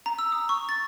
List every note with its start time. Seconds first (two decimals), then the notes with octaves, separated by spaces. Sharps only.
0.06 A#5
0.19 E6
0.32 D#6
0.49 C#6
0.69 A6